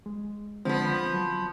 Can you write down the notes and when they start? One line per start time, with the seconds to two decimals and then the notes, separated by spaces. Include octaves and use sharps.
0.06 G#3
0.65 D3 F3 G#3 B3 C4
1.13 F#3